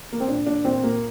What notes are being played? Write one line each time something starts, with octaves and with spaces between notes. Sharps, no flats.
A#3
C4
A#2 D4
A#2 D4
A#2 C4
A#2 A#3